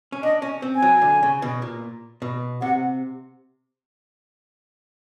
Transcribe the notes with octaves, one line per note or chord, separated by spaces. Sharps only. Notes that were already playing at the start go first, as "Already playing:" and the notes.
C#4
D4 D#5
C#4
C4
G#5
F#3
D3
C#3
B2
A#2
B2
C3 F#5